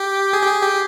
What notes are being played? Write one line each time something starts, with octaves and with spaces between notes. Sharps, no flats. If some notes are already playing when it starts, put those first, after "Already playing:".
Already playing: G4
G#4
G4
G#4
G4